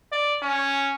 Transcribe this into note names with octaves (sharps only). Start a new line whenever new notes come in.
D5
C#4